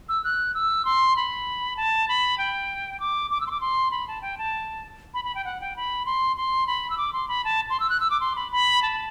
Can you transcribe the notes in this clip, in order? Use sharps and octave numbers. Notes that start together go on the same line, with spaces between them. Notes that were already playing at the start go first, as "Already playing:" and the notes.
E6
F#6
E6
C6
B5
A5
B5
G5
D6
D6
E6
C6
D6
C6
B5
A5
G5
A5
B5
B5
G5
F#5
G5
B5
C6
C6
B5
E6
D6
C6
B5
A5
C6
E6
F#6
E6
D6
C6
B5
B5
A5